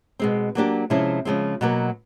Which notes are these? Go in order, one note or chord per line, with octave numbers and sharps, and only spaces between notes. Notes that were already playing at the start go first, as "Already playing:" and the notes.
B2 G#3 C4
F#3 A#3 D4 G4
C3 F3 G#3 C#4 E4
C#3 F3 G#3 C4
B2 F#3 A#3